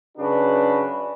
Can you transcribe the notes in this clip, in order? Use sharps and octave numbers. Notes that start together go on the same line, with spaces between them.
F#2 C#3 D4 F#4 B4